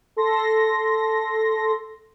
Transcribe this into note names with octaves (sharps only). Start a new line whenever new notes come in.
A4 C6 A#6